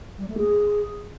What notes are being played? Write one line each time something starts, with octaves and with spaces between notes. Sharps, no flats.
G3
A3
G#4